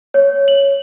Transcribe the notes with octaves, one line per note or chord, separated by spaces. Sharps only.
C#5
F#7